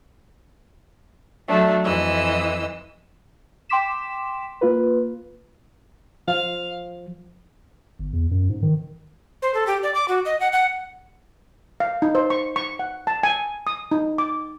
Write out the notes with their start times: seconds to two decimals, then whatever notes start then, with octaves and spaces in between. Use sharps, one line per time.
1.48 F#3 A3 D4
1.84 F2 E3 D#5 E6
3.69 G5 C6 D6 B6 E7
4.61 A#3 F4 B4
6.28 F3 F5
7.99 G1
8.13 E2
8.31 F#2
8.50 G#2
8.63 D#3
9.42 C5
9.54 A4
9.67 G4
9.83 D5
9.94 D6
10.08 F#4
10.25 D#5
10.40 F#5
10.53 F#5
11.80 F5
12.02 D#4
12.15 C5
12.30 C#6
12.56 C#6
12.79 F#5
13.07 A5
13.23 G#5
13.67 D#6
13.91 D#4
14.18 D6